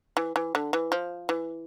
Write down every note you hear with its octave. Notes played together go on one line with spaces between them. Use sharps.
E3
E3
D3
E3
F3
E3